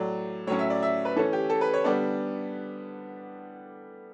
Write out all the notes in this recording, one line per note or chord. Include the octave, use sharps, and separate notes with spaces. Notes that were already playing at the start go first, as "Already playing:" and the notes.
Already playing: A2 F#3 A3 D5
A2 F#3 C#4 C#5
E5
D5
E5
B4
E3 A3 C#4 A4
G4
A4
B4
C#5
D3 G3 B3 D4 D5